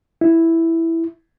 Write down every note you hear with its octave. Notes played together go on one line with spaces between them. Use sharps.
E4